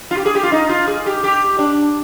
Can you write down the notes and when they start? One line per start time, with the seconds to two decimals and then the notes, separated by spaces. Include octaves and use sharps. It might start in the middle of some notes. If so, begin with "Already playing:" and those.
0.11 F4
0.17 G4
0.26 G#4
0.35 G4
0.43 F4
0.52 D#4
0.69 F4
0.88 G#4
1.06 G4
1.24 G4
1.59 D4